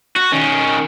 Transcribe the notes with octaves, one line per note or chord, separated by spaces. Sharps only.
F#4
D#3 C#4